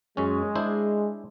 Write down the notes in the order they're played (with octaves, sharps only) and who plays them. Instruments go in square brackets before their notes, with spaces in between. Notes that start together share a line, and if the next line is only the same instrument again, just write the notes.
[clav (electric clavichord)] F#2 C#4 [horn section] G#3
[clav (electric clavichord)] D4 E4 C5